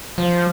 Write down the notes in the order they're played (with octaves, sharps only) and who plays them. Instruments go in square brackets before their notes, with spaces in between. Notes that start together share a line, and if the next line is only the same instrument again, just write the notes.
[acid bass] F3